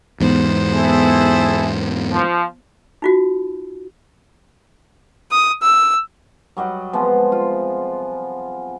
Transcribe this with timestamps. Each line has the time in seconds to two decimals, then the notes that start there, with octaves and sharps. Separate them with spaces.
0.21 E2 G#2 B3 C5
0.73 E4 G#4 A4
2.12 F3
3.02 D#4 F4 F#4
5.31 D#6
5.63 E6
6.57 F#3 G3 D#5 F#5
6.93 C3 F3 G#3 B3
7.32 F4